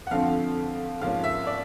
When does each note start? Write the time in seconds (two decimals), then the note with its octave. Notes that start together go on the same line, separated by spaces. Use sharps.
0.07 F#5
0.11 F2 D3 F3 A3 C4 F5
1.01 G#2 F3 A#3 C#4 F5
1.24 E5
1.47 D5